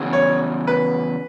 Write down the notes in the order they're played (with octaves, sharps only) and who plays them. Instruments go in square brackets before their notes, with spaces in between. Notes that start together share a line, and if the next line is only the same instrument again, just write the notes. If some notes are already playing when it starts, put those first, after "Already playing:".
Already playing: [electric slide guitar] E2 C#3 F#3
[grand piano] C#5
B4